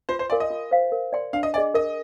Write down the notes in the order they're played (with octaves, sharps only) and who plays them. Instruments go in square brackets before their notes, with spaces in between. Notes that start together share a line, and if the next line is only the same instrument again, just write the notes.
[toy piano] F4 [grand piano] C5
[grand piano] C5
[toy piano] A#4 F5 G#5 C6 [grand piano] D5
[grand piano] D#5
[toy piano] F4
C5 F5
A#4
D5 G5 C6
[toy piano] D4 [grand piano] F5
[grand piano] D#5
[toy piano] G#4 D#5 G#5 [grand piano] D5
[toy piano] A#4 [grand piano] D#5